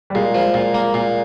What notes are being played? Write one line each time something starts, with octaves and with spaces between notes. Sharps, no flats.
G3
A#2 G#3
F3
A#2
A#3
A#2